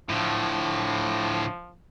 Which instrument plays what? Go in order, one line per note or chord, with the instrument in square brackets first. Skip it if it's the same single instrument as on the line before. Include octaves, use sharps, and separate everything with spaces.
[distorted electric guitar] A2 D3 [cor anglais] F3